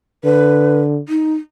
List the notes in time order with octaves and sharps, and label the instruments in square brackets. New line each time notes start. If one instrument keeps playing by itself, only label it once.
[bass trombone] D3 [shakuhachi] B4
[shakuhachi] D#4